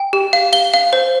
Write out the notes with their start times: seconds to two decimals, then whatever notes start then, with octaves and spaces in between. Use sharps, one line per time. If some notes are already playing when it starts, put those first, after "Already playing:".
Already playing: G5
0.13 G4
0.33 F5
0.53 F5 G7
0.74 F5
0.93 C5